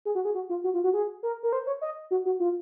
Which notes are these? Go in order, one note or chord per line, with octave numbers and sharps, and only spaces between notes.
G#4
F#4
G#4
F#4
F4
F#4
F4
F#4
G#4
A#4
A#4
C5
C#5
D#5
F#4
F#4
F4